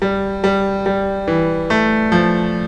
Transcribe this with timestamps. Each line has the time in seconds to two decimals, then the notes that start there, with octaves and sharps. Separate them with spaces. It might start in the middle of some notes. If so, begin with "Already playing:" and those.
0.02 G3
0.44 G3
0.86 G3
1.28 E3
1.70 A3
2.12 F3